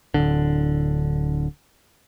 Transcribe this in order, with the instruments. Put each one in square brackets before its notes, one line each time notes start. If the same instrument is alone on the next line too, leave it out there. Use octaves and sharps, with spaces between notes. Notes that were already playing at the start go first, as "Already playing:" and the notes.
[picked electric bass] D1 G1 D3